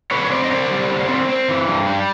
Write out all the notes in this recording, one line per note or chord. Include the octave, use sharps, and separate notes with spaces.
D3 B4 C#5
C#5
C4 C5 D5
D#5
D3 C5 D5
G3
D3
C4
C4
E3
G2
G3